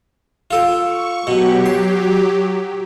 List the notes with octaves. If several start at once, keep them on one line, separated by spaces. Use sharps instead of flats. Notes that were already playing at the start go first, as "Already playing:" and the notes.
F4 A4 G5
C#6
B2 F#3 G4
C6